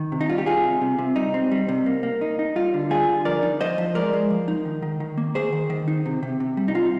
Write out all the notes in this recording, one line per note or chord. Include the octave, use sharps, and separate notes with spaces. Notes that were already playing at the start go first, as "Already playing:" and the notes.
Already playing: D#3
C3
D#4
G3 F4
G4
G3 F4 G#4
C3
C3
C3
G3 D#4
C4
G3
C3
A#3
A#3
D#4
D#4
G3 F4
D3
G3 F4 G#4
D3
F3 A#4 D5
D#4
F3 C5 D#5
F3
G#3 A#4 D5
G#3
F3
D#4
D#3
D#3
D#3
A#3
D#3 G#4 C5
D#3
D#3
D#4
C3
C3
C3
G3
D#4
C3 F4